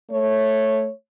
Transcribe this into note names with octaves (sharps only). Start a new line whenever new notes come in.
A3 C#5